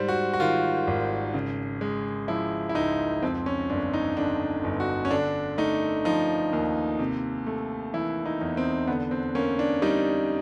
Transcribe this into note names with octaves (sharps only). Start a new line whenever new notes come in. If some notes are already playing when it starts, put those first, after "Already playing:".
Already playing: G#2 G3 C5
F#4
F#4
D#3 F4
G#1
C#3
G#3
F3 E4
E4
C#2 D#4
F2 C4
C#4
G1 D4
D#4
D3 D4
G1
F#4
C#4
D3 D4
A3 D#4
F3 D#4
D#2
C3
A3
E3 E4
D#4
E2
C4
D3 B3
C4
A#3 C#4
D4
G3 D#4